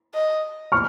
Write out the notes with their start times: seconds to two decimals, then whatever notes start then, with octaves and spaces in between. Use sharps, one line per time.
0.14 D#5
0.72 C#6 F6